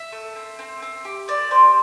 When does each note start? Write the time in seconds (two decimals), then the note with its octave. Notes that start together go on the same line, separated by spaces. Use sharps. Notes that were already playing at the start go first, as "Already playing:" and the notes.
Already playing: E5
0.12 A3
0.36 C4
0.59 C4
0.82 C4
1.05 G4
1.28 C4 D5
1.51 G4 C5